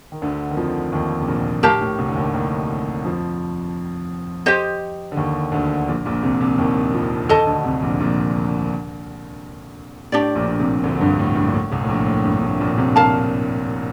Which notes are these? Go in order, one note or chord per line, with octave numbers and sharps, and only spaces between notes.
D#3
D2 D3
D#3
F2 F3
D#2 D#3
C3
A#1 A#2
A2 G4 A#4 F5 A5
A2
C2 C3
D3
D#2 D#3
D#2 D#3
F2 F3
G4 C5 D#5
D3
D#2 D#3
D2 D3
A#1 A#2
A#1 A#2
C2 C3
C2 C3
D#2 D#3
F2 F3
D#2 D#3 A4 D#5 A5
D2 D3
C2 C3
A#1 A#2
A#1 A#2
A2 D4 G4 D5
A#1 A#2
C2 C3
D2 D3
G2
A2
G2
A#2
A2
C2 C3
A2
A#1 A#2
A2
G2
A2
A#1 A#2
C2 C3
A#4 F5 A5